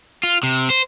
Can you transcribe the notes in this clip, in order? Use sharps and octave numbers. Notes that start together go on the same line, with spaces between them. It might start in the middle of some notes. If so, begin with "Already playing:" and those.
F4
C3
C5